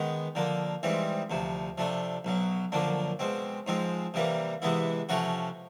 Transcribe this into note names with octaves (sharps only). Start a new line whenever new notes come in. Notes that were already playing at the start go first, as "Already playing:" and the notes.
Already playing: D#3 G#3 B3
D3 F3 A#3
G#2 E3 G3 C4
D2 C3 F3
C3 F3 A3 D4
B1 B2 F#3
F#2 D3 F3 A#3 D4
B2 G#3 C4
G#2 F3 G#3 C4
C3 E3 G3 A#3
C3 E3 G#3 B3 E4
C3 F3 A3 C#4 F#4